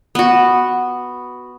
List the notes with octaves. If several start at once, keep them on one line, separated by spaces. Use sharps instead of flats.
B3 F#4